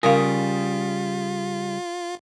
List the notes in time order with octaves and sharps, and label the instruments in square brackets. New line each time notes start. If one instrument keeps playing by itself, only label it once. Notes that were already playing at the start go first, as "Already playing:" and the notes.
[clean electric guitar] C#3 G3 G#4 [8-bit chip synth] F4 [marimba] A#4 F5